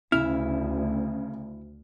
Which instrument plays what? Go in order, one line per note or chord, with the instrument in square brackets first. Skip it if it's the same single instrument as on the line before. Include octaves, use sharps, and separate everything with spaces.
[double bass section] D2 [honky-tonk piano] C#3 [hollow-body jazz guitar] E4 [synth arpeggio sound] F6